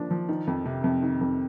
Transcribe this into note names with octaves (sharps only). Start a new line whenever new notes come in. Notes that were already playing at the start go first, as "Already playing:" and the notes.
Already playing: F3 A#3 D4
F3
D#3
F2
C3
F2
D#3
F2